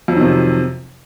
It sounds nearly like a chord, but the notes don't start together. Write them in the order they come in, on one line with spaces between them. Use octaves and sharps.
F2 F#3 D#3 C3